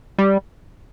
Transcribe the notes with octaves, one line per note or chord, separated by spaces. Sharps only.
G3